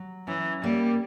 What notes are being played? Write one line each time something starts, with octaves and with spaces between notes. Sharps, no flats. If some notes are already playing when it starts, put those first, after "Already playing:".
Already playing: F#3
E3 C#4
G3 A#3